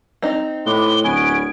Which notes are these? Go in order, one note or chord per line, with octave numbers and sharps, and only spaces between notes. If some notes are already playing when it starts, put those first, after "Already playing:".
C4 D#4
A2 G#3 B4 D6 G7
D1 B3 C#4 G#5 D7